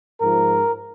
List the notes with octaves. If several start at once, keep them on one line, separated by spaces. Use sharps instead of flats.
G#2 F3 A#4